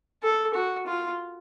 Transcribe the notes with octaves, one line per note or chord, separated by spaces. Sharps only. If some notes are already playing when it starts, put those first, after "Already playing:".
A4
F#4
F4